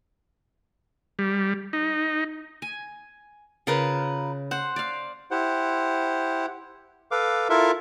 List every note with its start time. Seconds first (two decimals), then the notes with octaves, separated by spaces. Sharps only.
1.19 G3
1.73 D#4
2.62 G#5
3.67 C#3 F4 A#4 B4
4.51 C5 F#5
4.76 D5 F5
5.31 E4 G4 C5 F#5
7.11 A4 B4 F5 D6
7.49 E4 F4 A4 A#4 E5